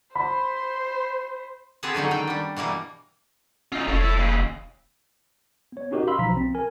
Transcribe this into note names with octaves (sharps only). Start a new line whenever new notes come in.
C5 B5
B3 C4 G4 G#4 A5
D3 F#3 C#4 D#4
D#3 G5
G3 D4
B2 E3 G3 A#3
C#4 D#4 F4
F1 A4 C#5
E4 A4
D#2 C#3
B3 C#5
C#4 D#4 F#4 G4 A#4 D#5
F5 B5 C6 E6
B1 C3 F3 A#5 B6
C4
A#4 G#5